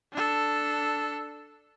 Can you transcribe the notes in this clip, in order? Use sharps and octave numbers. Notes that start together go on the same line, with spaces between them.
D4 A4